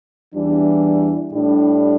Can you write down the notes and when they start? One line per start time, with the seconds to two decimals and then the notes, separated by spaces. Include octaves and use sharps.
0.33 E2 E3 G3 D4
1.33 A2 G3 D4